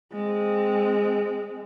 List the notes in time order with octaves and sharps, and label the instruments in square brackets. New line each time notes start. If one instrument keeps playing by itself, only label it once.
[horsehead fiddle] G#3 C4